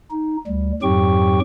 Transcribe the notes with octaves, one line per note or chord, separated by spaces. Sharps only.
D#4
D2 G3
F2 G#2 F#3 G4 G5 C#6